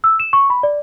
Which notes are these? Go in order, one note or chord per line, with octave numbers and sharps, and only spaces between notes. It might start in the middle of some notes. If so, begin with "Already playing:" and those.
E6
E7
C#6
B5
D5